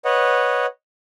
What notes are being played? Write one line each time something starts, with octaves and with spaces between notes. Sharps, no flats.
B4 C#5 D#5 F#5